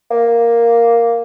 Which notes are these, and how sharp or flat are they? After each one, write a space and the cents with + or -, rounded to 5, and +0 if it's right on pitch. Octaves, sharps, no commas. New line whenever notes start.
A#3 +0